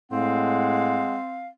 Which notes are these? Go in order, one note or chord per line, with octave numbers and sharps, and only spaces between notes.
A2 G#3 C4 F5 F#5